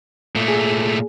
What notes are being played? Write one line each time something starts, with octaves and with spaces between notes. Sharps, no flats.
A#2 A3
G#4